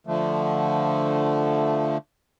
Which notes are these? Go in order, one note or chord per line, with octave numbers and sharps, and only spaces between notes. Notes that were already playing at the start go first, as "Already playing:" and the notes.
D3 F3 A3